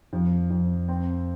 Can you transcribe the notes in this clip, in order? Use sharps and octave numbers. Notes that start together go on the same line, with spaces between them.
F2
F2
C4